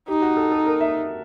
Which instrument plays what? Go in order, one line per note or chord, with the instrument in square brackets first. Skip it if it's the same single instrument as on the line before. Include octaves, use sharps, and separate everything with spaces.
[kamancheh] D#4 [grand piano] G4
[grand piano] F#4
A4
A4
A#4
E5